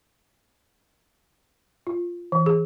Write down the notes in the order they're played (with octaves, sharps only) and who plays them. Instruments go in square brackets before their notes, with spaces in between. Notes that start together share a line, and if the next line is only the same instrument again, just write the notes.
[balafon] F4
E3
G#4